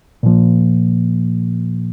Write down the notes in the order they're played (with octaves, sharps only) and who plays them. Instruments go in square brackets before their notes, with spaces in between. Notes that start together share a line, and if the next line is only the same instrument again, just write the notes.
[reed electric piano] A#2 F3 A#3